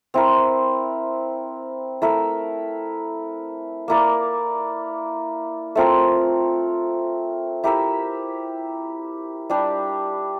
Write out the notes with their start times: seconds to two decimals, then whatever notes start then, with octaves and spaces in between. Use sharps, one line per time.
0.14 C4 E4 A#4
2.02 A3 E4 A#4 E5
3.88 A#3 E4 A#4 D5
5.75 A3 C4 F4 A#4
7.64 E4 G4 A#4 E5
9.50 G3 D4 G4